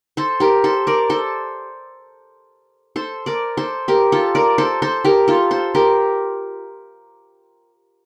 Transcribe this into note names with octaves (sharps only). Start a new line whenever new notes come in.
A4 C5
G4 A#4
A4 C5
A#4 D5
A4 C5
A4 C5
A#4 D5
A4 C5
G4 A#4
F4 A4
A#4 D5
A4 C5
A4 C5
G4 A#4
F4 A4
A4 C5
G4 A#4